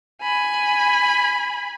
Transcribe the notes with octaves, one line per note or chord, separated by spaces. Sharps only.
G#5 B5